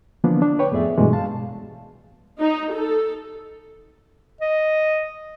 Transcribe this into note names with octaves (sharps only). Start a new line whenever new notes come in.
D3 E3 F3 A#3 B3 D4
D4
B4 C#5 G5
F2 A2 B3 G#4 D5 E5
G2 B2 E3 G#3 A3
F5 A5
D#4
A4
D#5